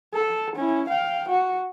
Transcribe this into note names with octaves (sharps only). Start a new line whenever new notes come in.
A4
C#4 E4
F5 G5
F#4